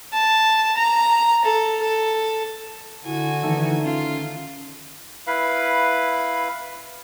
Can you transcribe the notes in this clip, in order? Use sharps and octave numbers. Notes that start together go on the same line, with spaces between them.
A5
A#5
A4
A4
D3 E4 F#4 G#5
D#3 E3 A3 D#4
C#4 F4
E4 B4 F5 B5